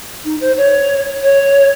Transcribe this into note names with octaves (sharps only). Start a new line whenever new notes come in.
D#4
C5
C#5
C#5